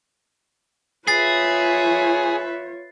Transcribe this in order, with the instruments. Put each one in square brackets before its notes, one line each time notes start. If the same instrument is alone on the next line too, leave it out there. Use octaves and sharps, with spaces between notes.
[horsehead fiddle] F4 C#5 [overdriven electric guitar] G#4 [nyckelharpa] B4 E5 [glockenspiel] A6 C7